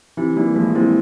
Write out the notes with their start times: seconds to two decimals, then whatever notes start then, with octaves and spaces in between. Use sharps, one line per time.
0.17 C3 E3 E4
0.36 E3 G3 A#3
0.55 F3 G#3 A#3
0.75 G#3 C4 E4